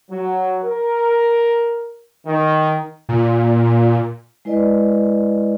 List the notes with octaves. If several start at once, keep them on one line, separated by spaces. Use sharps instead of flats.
F#3
A#4
D#3
A#2
G#3 E4 B4 D5 D#5